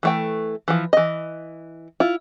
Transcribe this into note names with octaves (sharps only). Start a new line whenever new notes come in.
E3 A3 G5
E3 F3
E3 D#5
E4 F4